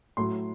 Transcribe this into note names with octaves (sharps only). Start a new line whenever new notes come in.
A2 F#3 C6